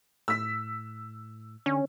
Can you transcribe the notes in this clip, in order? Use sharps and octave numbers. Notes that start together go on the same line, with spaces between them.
A2 E6 B6
D3 C#4